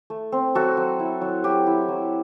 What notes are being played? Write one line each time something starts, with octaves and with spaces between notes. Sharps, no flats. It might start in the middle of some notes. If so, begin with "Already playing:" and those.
A3
C4
F#3 F#4 A4
F#3
E4
F#3
F#3 G4
E4
F#3